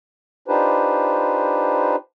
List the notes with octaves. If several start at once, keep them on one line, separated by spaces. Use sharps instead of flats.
D4 D#4 F4 G4 B4 C5